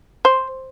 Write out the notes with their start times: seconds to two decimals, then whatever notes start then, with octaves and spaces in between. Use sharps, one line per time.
0.25 C5